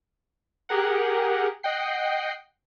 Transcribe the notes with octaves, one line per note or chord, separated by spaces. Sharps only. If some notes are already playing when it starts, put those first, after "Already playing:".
G4 G#4 A#4 F#5
D#5 F#5 G5 C7